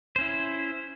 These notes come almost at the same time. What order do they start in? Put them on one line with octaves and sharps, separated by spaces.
C5 C#4 E4